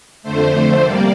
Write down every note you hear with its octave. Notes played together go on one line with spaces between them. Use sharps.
F2 D3 A3 C5
C3 G3 A#3 D5